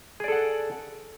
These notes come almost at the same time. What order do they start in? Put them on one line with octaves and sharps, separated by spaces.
G#4 D5 A4 F#5